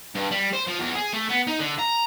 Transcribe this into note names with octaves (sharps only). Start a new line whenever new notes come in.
G2
G3
C5
F3
E2
G#4
A3
B3
D#4
D3
A#5